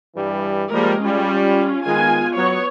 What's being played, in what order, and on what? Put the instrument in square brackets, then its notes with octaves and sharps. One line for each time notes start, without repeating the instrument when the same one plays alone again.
[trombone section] G2 E3 G3
[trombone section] F3 G3 [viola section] G#3 A#3 A#4
[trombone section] G3 [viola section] C#4 F4
[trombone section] D#3 G#3 [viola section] B3 F4 G#5
[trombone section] F#3 [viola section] B3 C#5